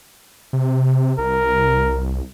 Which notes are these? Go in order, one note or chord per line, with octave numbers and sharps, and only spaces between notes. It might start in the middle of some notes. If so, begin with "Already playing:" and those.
C3
C2 A#4